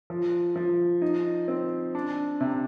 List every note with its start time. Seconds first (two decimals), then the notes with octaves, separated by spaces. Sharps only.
0.10 F3
0.56 F3
1.02 D#4
1.48 C4
1.95 D4
2.41 C3